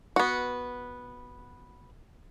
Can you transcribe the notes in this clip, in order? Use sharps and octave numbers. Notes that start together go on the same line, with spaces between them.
B3 F#4